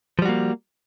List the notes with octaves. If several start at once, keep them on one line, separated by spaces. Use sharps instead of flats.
F3 G3 A#3 F#4